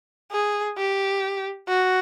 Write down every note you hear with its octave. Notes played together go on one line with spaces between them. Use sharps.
G#4
G4
F#4